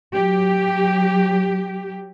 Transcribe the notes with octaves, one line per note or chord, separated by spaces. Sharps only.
F#3 G4